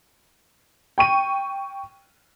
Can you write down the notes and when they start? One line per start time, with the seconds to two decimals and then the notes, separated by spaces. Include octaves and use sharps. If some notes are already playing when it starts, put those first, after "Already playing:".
0.98 G5 C#6 D#7